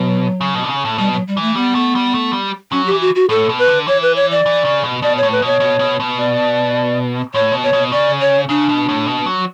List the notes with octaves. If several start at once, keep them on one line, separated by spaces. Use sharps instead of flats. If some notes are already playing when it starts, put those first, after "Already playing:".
Already playing: B2 F#3
C#3
B2
D3
C#3
A2
B2 G3
F#3
G3
E3 A3
G3 B3
A3
G3
A3
G3
F#3 C#4
G4
E3
F#4
F#4
A2 A4
B2
B4
D3
E3 C#5
B4
C#5
D5
E3
C#3
B2
B2 D5
C#5
A2
B4
B2 C#5
B2
B2
B2
D5
A2 C#5
B2
C#5
B2
C#3 D5
C#5
C#3 D4
B2
A2
B2
F#3